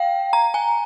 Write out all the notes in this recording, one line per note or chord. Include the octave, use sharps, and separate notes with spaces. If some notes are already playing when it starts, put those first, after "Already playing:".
Already playing: F5 G5
A#5
G#5